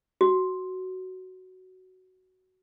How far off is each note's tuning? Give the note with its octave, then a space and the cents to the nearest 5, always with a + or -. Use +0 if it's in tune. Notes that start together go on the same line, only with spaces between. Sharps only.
F#4 +10